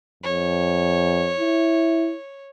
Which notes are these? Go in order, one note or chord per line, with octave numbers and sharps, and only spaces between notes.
F2 C#5
E4